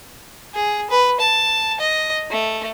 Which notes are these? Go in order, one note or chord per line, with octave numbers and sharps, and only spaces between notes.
G#4
B4
A5
D#5
A3